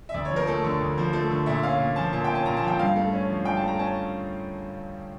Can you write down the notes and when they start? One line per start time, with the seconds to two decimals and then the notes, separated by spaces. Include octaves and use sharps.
0.09 E5
0.14 D2 D5
0.25 C#5
0.30 F3
0.36 A#4
0.47 A3 A4
0.64 D3
0.80 D2
0.98 F3
1.13 A3
1.30 D3
1.46 A#2 E5
1.63 C#4 F5
1.79 A#2
1.96 F3 A5
2.13 A#2 A5
2.24 G5
2.30 C#4
2.35 A5
2.46 A#2 A#5
2.57 A5
2.63 F3
2.68 G5
2.79 G2 F5
2.96 A3
3.12 C#4
3.29 F3
3.45 G2 G5
3.57 A5
3.62 A3
3.68 A#5
3.79 C#4 A5